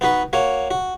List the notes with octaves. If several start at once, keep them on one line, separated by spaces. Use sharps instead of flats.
B3 D#4 F#4 B4
A#3 F#4 C#5
F#4